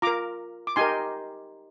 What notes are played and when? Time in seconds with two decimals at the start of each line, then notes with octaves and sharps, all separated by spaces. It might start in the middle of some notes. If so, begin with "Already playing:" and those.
0.02 F4 A#4 A#5 D6
0.67 D6
0.76 D#4 G4 A#4 G#5 C6